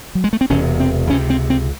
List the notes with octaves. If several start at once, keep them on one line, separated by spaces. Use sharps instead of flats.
F#3
G#3
A3
C4
E1 E2 C3 C#4
C4
C#2 C3 C#4
C4
C4